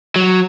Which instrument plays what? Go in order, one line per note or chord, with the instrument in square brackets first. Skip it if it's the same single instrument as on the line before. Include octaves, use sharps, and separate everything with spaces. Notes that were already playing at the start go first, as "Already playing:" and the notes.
[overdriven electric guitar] F#3